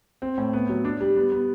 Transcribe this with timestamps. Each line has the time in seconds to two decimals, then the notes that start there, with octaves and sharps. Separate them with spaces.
0.22 C4
0.38 A2
0.53 B3
0.69 F#3
0.85 D4
1.01 G3
1.16 B3
1.32 B3